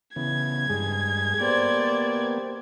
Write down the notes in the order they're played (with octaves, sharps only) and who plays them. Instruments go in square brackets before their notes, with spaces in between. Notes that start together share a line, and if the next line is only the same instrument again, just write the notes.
[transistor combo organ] C#3 E3 B3 [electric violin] G#6
[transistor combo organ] G2 G#3 G#4
[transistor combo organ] A#3 B3 G4 [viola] C5 D5